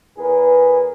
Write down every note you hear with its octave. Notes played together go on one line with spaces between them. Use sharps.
E2 G#4 A#4 B4